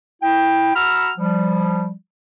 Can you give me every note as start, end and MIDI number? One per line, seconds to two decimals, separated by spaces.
0.23 0.74 64
0.23 0.74 79
0.75 1.11 66
0.75 1.11 78
0.75 1.11 82
0.75 1.11 83
0.75 1.11 88
0.75 1.11 89
1.18 1.92 53
1.18 1.92 55